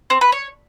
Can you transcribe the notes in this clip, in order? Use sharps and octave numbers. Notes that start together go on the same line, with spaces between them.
C4
B4
C#5